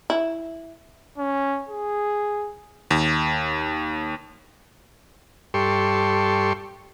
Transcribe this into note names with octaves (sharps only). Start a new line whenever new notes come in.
E4
C#4
G#4
D#2
G2 G4 A4 C6 C#6